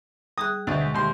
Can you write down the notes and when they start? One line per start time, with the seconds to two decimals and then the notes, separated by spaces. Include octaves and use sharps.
0.38 G3 G#4 D#6 F#6
0.67 D2 B2 D#5 F#5
0.81 G#3
0.94 D#2 C6